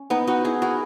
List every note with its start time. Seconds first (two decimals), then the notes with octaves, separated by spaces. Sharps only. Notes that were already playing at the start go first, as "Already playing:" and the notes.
Already playing: C#4
0.10 B3 D#4
0.27 D#4 F#4
0.45 E4 G#4
0.62 F#4 A#4